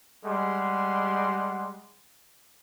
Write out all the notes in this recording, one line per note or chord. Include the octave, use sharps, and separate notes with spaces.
G3 G#3 F#5 C6